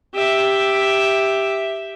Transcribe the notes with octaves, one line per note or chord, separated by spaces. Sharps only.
G4 E5